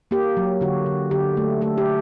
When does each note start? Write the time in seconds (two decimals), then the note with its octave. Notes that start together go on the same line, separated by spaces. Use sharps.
0.11 A#3 G4
0.37 F#3
0.61 D3 F#4
0.86 D3
1.11 D3 G4
1.37 A3
1.61 A3 A4
1.78 G4